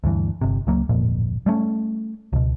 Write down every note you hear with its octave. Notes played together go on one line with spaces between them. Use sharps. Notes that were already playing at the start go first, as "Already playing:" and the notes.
D2 G2 E3
G1 C3
C#2 F#3 A#3
D1 G#1 F2 A#2
G3 A3 B3 C#4
C#2 B2